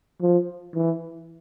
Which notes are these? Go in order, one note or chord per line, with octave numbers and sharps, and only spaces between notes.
F3
E3